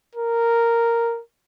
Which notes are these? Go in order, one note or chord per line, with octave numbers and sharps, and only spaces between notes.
A#4